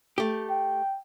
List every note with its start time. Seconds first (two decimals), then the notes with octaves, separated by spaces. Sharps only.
0.18 A3 G4
0.49 G5